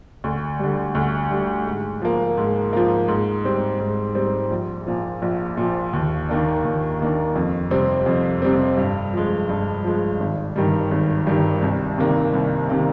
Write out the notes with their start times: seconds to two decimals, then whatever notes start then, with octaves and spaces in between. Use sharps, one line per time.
0.24 D2
0.59 D3 G3
0.95 D2
1.31 D3 G3
1.66 G#2
2.02 F3 A#3
2.37 G#2
2.73 F3 A#3
3.08 G#2
3.44 G3 C4
3.80 G#2
4.15 G3 C4
4.51 A#1
4.87 A#2 F3
5.22 A#1
5.57 A#2 F3
5.93 D#2
6.29 D#3 A#3 D4
6.65 D#2
7.00 D#3 A#3 D4
7.36 F2
7.71 C3 G3 C4
8.06 F2
8.42 C3 G3 C4
8.78 G2
9.13 F3 G#3
9.49 G2
9.84 F3 G#3
10.20 G#1
10.56 G2 D#3 G3
10.91 G#1
11.27 G2 D#3 G3
11.62 C2
11.98 C3 D#3 A#3
12.34 C2
12.69 C3 D#3 A#3